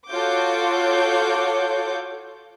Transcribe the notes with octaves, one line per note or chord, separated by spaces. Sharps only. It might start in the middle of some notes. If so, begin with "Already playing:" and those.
F4 F#4 A4 C#5 D6 G6